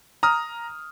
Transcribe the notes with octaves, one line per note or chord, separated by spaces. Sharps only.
A#5 D#6 F6